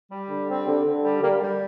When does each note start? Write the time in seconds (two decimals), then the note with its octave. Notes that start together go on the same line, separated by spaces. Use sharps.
0.11 G3
0.29 D3
0.49 G3 C4
0.67 D3
0.85 D3
1.03 G3
1.22 G3 A#3
1.41 G3